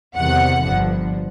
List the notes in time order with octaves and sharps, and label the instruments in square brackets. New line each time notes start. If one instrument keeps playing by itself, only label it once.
[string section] E2 C3 D#3 G3 F#5
G1 G2 D3 F3